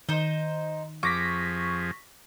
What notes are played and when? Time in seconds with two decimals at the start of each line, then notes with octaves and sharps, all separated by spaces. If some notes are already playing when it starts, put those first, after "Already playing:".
0.09 D#3 D#4 C5
1.03 F2 F3 G#4 C#6 D6 A#6 B6